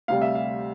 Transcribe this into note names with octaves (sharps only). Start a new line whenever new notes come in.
D2 C3 G3 F5
E5
F5